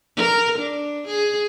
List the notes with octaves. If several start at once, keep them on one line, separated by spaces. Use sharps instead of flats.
A#4
D4
G#4